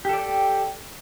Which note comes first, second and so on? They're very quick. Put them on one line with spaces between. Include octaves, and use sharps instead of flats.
G4 A4 D5 G5